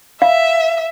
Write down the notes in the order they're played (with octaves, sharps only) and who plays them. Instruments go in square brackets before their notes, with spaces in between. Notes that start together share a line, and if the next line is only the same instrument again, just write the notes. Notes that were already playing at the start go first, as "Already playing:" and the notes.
[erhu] E5 [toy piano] F5